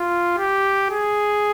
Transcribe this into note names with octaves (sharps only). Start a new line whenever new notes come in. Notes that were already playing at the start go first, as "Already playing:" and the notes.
Already playing: F4
G4
G#4